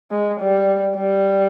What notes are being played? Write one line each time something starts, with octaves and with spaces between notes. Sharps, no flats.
G#3
G3
G3